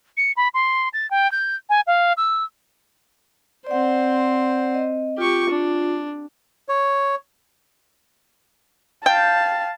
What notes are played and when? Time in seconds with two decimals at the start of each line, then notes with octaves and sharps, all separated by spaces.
0.17 C#7
0.37 B5
0.54 C6
0.93 A6
1.11 G5
1.32 G6
1.69 G#5
1.87 F5
2.17 E6
3.67 C4 C5 D5 F#5
4.74 D#5
5.18 F4 G4 C#6
5.50 D4
6.69 C#5
9.06 F5 G5 A5